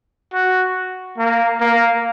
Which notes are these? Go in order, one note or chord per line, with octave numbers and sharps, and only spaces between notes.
F#4
A#3
A#3